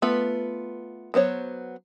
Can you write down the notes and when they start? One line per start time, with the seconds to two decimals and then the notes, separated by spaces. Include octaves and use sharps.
0.02 A3 B3 F4 B4
1.14 F#3 B3 C5 C#5